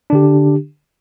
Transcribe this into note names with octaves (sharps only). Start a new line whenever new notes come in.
D3 D4 G4